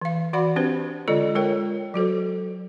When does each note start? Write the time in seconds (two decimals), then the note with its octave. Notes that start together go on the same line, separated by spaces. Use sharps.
0.02 E3 F5
0.33 E3 F#4 D5 F#5 B5
0.56 C4 D4 G4 B4 C5
1.08 D3 G#3 F4 A4 D5 D#5
1.35 G#3 F4 A#4 C#5 G5
1.94 F#3 F#4 A4 C5